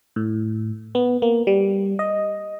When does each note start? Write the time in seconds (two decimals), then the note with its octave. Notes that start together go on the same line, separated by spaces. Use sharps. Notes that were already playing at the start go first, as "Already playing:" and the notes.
0.16 A2
0.95 B3
1.22 A#3
1.47 G3
1.99 D#5